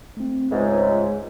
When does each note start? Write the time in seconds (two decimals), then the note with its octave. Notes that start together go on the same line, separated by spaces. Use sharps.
0.17 A3 C4
0.51 C#2 G#2 G#3 F4 C5 E5